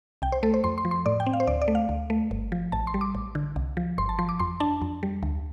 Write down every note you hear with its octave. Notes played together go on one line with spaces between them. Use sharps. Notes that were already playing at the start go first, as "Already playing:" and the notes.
C2 G5
C5
A3 A4
C5
F2 C6
C6
F3
C6
A2 D5
G5
C4
F5
C5
D2 D5
D5
A3
F5
D2
A3
G1
F3
A1 A5
C6
G3
D6
A1
D3
C2
F3
G1 C6
A5
F3 C6
D6
F2 C6
D4 A5
F2
G3
D2